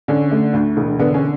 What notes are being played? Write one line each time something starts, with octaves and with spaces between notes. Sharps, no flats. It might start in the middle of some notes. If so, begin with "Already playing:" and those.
D3 C#4
A3
D2
E1
D3 B3
C#4